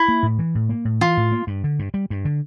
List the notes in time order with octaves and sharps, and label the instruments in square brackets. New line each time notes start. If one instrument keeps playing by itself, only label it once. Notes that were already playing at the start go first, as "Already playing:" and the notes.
Already playing: [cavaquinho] E4
[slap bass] A#3
A2
E3
A2
A#3
A2
[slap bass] E3 [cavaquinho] F4
[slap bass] A2
A#3
G2
D3
G2
G3
G2
D3